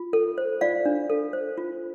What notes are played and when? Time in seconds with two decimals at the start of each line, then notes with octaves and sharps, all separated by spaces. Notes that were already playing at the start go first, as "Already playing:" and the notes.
Already playing: F4
0.13 A4
0.38 C5
0.61 F4 D5 F5
0.85 D4
1.10 A4
1.33 C5
1.58 F4